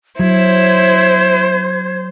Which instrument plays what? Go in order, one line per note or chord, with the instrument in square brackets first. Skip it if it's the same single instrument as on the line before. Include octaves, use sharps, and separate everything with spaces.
[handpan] F#3 [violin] E4 [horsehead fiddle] C5 [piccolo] G#6